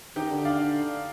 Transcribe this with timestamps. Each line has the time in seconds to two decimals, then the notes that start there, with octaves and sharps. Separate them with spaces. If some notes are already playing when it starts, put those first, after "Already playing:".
0.16 D#3 D#4 G4
0.30 D3
0.45 D5 F5